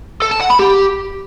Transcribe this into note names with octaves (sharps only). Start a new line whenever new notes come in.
A4
A5
F#5
B5
G4